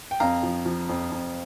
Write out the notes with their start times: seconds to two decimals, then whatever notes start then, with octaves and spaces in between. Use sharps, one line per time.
0.11 G5
0.20 F2 F5 A#5
0.43 F3
0.66 F3
0.89 F2
1.12 F2